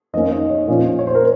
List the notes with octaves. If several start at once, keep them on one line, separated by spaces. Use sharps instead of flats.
F2 D#3 A#3 C#4 D#5
D#5
C#5
A#2 F3 A#3 C#4
C#5
C5
A#4